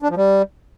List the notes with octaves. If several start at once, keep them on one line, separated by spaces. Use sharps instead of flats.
D4
F3
G3